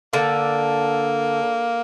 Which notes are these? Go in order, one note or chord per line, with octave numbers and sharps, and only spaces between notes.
D3 A#3